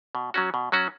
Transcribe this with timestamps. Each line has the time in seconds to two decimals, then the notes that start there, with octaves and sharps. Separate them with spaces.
0.15 B2
0.34 F#3 C#4 F#4
0.54 B2
0.72 F#3 C#4 F#4